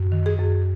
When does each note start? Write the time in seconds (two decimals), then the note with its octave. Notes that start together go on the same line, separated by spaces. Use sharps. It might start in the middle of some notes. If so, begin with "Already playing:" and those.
Already playing: F#2
0.12 D#3
0.26 G#4
0.40 F#2